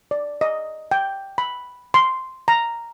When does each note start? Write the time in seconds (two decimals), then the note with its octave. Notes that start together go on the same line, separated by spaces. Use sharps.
0.11 D5
0.41 D#5
0.91 G5
1.38 B5
1.94 C6
2.48 A#5